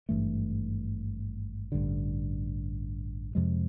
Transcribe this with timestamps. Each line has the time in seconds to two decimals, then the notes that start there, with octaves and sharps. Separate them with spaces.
0.09 G#1 G2 E3 A3
1.72 A1 G2 D3
3.35 F2 C3 F3 G#3